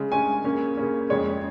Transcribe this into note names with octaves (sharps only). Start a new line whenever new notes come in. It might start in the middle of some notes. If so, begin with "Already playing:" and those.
Already playing: C#3 G#3 C#4
C#3 G#3 C#4 G#5
C#3 A#3 C#4
C#3 A#3 C#4
F2 C#3 G#3 C#5